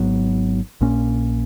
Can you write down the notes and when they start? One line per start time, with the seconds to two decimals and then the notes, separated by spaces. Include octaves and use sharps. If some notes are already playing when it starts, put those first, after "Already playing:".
Already playing: G#1 G#2 F#3 B3
0.81 A#1 A#2 A#3 C#4